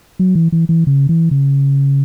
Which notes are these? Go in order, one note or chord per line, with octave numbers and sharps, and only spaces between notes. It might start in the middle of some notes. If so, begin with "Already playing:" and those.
F#3
E3
E3
E3
C#3
E3
C#3